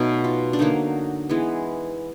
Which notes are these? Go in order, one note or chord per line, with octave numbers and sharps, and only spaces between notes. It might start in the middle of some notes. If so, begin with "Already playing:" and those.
Already playing: B2 F#3 A3 D#4
F4
D4
D3 F#3 A#3 D#4
E3 G#3 B3